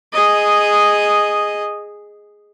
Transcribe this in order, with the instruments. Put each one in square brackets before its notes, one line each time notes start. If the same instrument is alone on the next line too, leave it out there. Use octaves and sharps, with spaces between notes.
[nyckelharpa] G#4 D#5